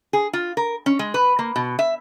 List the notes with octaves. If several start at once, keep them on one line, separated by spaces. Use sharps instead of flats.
G#4
F4
A#4
C#4
G#3
B4
A#3
B2
E5